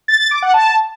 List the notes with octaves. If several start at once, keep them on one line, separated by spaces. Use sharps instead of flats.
A6
A6
D6
F#5
A5